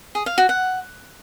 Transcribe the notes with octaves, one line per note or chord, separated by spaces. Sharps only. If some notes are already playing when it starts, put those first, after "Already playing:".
G#4
F5
F#4
F#5